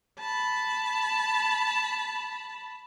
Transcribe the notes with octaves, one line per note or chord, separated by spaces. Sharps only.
A5 B5